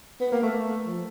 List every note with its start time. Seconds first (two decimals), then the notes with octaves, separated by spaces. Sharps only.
0.21 B3
0.32 A#3
0.42 A3
0.86 F3